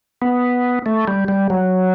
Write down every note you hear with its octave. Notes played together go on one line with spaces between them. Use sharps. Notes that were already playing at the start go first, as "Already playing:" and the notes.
B3
A3
G3
G3
F#3